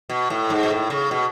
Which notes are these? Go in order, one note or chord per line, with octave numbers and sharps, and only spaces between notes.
B2
A2
G#2
B2
A2
C#3
B2